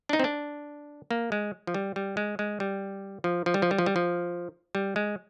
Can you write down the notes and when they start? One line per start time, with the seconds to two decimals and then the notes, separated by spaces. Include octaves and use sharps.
0.09 D4
0.13 D#4
0.20 C4
0.24 D4
1.11 A#3
1.32 G#3
1.67 F3
1.74 G3
1.96 G3
2.17 G#3
2.39 G#3
2.60 G3
3.24 F3
3.46 F3
3.54 G3
3.62 F3
3.71 G3
3.79 F3
3.86 G3
3.96 F3
4.75 G3
4.96 G#3